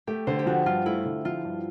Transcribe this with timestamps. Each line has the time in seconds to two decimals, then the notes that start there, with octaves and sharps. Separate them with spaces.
0.07 A3 G4
0.27 D3 C5
0.39 G4
0.46 F3 F#4
0.66 G2 F4
0.86 A3 E4
1.05 D3
1.25 F3 F4
1.45 G2